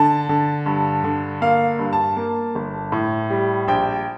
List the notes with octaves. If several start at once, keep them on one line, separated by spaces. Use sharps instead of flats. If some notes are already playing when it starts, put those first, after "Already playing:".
Already playing: D3 A5
D3
G2
D3
A#3 F5
G2
A5
A#3
G1
A2
G3
A#1 G5